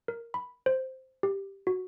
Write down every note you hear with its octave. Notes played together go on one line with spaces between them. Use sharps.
A#4
B5
C5
G4
F#4